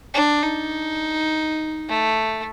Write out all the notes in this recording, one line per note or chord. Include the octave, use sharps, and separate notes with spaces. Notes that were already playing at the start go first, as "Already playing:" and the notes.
D4
D#4
A3